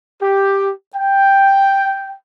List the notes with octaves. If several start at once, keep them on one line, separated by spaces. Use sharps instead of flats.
G4
G5